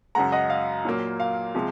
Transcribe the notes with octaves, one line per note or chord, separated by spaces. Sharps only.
F#2 C#3 G#3 F#5 A#5
D#5 F#5
F5
A#2 F#3 A#3
F5
C3 F3 G#3